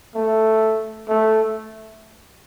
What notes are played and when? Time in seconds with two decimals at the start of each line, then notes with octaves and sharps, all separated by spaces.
0.15 A3
1.08 A3